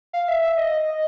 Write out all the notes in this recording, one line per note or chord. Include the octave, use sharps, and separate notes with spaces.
F5
E5
E5
D#5